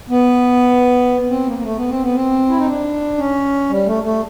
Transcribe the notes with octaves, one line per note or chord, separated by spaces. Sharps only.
B3
C4
A#3
A#3
A3
B3
C4
B3
C4
E4
D#4
D4
C#4
G3
A3
A3